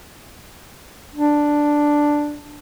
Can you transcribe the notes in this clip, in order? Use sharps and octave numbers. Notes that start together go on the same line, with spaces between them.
D4